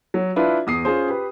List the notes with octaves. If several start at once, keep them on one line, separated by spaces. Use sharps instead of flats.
F#3
D4 E4 F4 B4
E2 D#6 C7
C#4 F4 G#4 C5
G4 B4